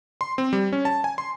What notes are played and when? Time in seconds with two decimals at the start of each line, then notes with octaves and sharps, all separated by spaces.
0.21 C6
0.38 C4
0.53 G3
0.73 C#4
0.85 A5
1.04 G#5
1.18 C6